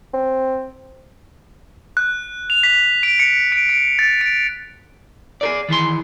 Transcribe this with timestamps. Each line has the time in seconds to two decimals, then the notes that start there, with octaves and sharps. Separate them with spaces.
0.14 C4
1.97 F#6
2.50 F7
2.63 B6
3.03 D7
3.19 C#7
3.52 D7
3.69 D7
3.99 A6
4.21 D7
5.41 G#4 A#4 D5
5.69 D#3 E3 G#4 C6